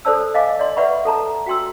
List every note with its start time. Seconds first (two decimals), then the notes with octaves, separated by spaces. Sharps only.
0.05 A4 C5 D5 A5 E6
0.34 D#5 F5 G#5 D6
0.59 D5 D#5 C6
0.76 B4 D5 E5 F#5 B5 C#6
1.05 A4 A5 A#5
1.46 F#4 G5 C6 E6